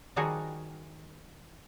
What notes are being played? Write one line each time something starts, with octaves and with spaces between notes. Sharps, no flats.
D#3 F3 G3 F#4 G#4 A#4